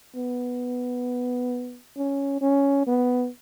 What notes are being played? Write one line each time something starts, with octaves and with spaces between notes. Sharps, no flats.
B3
C#4
C#4
B3